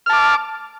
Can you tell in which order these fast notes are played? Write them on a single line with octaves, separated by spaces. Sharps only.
F6 A5 D6